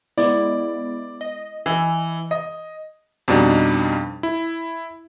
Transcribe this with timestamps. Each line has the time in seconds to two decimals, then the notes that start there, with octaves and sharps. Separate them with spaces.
0.18 G#3 B3 E4 D5
1.21 D#5
1.66 E3
2.31 D#5
3.28 F2 B2 G3 D4 D#4
4.23 E4